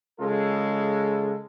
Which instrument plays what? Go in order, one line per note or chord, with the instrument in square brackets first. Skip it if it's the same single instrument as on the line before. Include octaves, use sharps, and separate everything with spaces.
[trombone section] C#3 G#3 F4 A4